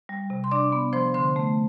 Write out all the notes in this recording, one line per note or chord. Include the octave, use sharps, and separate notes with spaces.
G3
C3
C6
D4 D5 D6
B3
F3 C5 C6
D3 C5 C6
A3